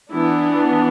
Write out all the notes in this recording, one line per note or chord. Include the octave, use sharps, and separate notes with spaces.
E3 B3 D4 E4